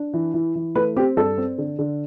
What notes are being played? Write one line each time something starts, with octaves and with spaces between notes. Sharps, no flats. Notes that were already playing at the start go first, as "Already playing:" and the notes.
Already playing: D4
E3
E3
E3
A3 B4
C4 G4
G2 A4
C4
D3
D3